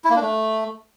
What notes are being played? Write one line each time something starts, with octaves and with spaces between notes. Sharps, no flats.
E4
A#3
D4
A3